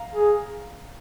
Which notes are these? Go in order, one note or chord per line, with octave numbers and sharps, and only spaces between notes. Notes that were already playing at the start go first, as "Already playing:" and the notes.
Already playing: F5 A#5
G#4